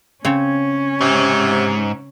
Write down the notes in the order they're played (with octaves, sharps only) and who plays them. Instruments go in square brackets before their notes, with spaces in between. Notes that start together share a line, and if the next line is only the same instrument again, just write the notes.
[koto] C#3 C4 C#5 [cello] C#4
[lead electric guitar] G#2 [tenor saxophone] C3